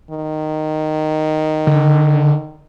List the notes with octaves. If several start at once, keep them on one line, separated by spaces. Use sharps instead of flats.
D#3
D3